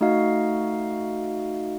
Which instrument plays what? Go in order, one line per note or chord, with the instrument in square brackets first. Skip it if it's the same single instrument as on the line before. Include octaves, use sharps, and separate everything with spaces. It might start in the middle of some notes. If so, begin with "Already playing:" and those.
[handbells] A3 D#4 F#4 D#5 F5